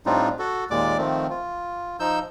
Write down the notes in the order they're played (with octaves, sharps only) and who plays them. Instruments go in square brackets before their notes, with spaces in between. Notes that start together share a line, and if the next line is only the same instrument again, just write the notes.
[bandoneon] A2 G3 C4 D4 D#4 F4
F#4 A4
D#2 A#2 G#3 D5 D6
D#3 F3 A3 C4
F4
F3 D#4 E6 G6